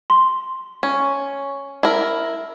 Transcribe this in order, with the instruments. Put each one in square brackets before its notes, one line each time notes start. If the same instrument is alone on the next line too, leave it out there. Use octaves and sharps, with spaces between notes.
[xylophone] C6
[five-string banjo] C#4
E4 A#4